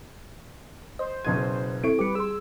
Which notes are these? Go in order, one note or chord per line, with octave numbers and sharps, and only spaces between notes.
C5 D#5
F#1 B2 G#6 D#7
C4 E4 A4 C#6 D7
G3 G4 B4 D6 C#7
G#4 C6 E6